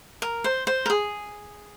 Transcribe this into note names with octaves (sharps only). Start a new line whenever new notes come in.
A#4
C5
C5
A#4
G#4